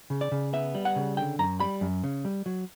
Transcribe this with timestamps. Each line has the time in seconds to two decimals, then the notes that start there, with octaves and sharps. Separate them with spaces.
0.10 C#3
0.21 D5
0.32 C#3
0.53 B3 E5
0.75 G3
0.85 F#5
0.96 C#3
1.17 D3 G5
1.39 F#2 A#5
1.60 G3 B5
1.81 F#2
2.04 C#3
2.25 G3
2.46 F#3